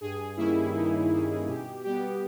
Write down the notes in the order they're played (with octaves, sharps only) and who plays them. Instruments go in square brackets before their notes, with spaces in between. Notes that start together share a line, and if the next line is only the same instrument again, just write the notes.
[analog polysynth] G2 G#4
D#3 G3 A#3 C#4 E4
G2 D#4
D#3 G3 A#3 C#4 E4
B2 G4
G3 B3 G4